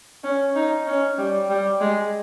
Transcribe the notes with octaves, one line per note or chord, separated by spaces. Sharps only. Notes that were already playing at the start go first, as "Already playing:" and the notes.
C#4
D#4
C#4
G3
G3
G#3